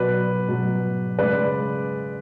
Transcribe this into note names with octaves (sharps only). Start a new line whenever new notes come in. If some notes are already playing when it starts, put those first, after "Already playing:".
Already playing: B2 F#3 B4 D5
B2 F#3
C#3 G#3 B4 D5